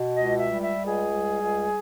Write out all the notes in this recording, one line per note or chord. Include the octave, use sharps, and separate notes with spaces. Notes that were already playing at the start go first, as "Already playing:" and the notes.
Already playing: B2
C#2 D#5
E5
G3
E5
C#2
G#4
G3
C#2